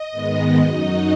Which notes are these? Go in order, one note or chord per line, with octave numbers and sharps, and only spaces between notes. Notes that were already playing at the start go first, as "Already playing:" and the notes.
Already playing: D#5
G#2 D#3 G#3 B3
F#2 F#3 D#4